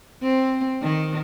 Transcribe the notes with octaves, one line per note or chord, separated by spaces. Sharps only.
C4
D#3